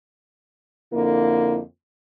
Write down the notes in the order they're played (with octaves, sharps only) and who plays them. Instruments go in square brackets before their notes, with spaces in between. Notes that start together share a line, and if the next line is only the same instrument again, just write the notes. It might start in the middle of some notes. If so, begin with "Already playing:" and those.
[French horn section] F2 D3 A#3 E4